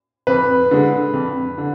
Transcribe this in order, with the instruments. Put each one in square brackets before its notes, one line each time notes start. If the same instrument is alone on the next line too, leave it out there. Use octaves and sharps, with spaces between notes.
[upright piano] F2 [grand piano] B4
[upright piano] D3 G#3
F2
D3